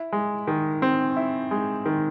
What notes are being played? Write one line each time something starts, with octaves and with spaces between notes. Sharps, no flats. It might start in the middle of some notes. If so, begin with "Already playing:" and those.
Already playing: E4
G#3
D#3
C4
E4
G#3
D#3